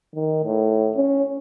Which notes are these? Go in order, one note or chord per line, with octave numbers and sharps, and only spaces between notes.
D#3
A2
C#4